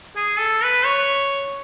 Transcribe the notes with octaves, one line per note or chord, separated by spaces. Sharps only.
G#4
A4
B4
C#5